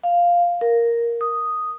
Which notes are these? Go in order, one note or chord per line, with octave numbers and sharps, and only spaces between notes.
F5
A#4
D#6